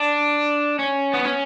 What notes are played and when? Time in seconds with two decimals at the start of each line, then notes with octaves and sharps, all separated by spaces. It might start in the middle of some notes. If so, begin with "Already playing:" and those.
Already playing: D4
0.79 C#4
1.13 B3
1.25 C#4